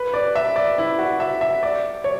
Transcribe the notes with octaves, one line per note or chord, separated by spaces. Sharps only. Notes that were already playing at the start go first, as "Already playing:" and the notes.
Already playing: B4
D5
E5
D5
E4
F#4
E5
E5
D5
C#5